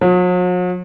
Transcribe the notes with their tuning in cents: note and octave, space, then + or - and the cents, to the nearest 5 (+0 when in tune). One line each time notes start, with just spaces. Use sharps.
F#3 -45